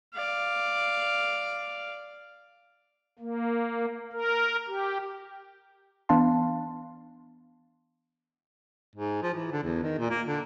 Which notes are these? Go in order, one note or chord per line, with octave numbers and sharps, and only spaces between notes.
D5 F5
A#3
A#4
G4
E3 B3 D4 F5 A5 C6
G#2
F3
E3
D3
E2
D#3
A#2
A#3
D3